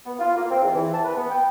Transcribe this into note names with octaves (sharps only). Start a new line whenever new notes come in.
B3
F4
A#3
C4
E2
E3
A5
B4
B3
G5